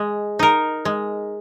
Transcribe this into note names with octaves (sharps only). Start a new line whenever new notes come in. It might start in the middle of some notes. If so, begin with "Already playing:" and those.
Already playing: G#3
D#4 A#4
G#3